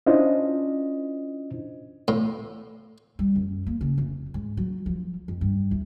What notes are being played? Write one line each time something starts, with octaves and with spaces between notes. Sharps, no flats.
C#4 D4 E4 F4 C5 D#5
A2
G3
F#2
A#3
C#3
F1
G#2
F#3
F3
F2
G2
E2